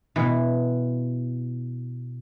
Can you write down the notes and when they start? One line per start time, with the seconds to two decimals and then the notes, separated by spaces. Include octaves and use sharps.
0.16 B2 E3